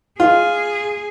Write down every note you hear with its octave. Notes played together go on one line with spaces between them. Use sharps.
F4 G#4